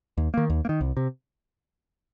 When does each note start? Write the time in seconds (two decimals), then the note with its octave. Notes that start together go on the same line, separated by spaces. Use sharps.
0.17 D#2
0.34 D#3 A#3
0.50 D#2
0.65 A#3
0.69 D#3
0.81 C2
0.97 C3